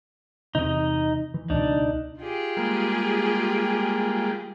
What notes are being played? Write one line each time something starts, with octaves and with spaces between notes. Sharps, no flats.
E2 C3 D#4 D#5
E3
C#2 B2 D4 D#4
F4 G4 G#4
G3 G#3 A#3